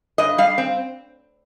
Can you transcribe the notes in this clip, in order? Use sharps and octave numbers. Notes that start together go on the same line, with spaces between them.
G2 D#5
G3 F5
C4